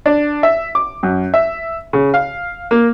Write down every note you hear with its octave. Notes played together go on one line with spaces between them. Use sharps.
D4
E5
D6
F#2
E5
C#3
F5
A#3